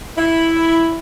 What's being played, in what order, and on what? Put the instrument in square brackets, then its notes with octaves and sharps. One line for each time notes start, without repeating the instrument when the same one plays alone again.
[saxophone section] E4